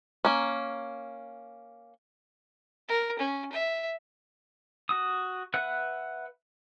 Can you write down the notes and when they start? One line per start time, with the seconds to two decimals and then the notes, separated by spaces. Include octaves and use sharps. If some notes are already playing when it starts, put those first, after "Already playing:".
0.25 A#3 C#4
2.88 A#4
3.19 C#4
3.52 E5
4.89 F#4 D#6
5.54 B4 E5 F#5 F#6